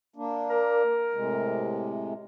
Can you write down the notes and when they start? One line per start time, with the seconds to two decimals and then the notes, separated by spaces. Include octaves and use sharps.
0.16 A#3 D4
0.49 A#4
1.14 A2 C3 G#3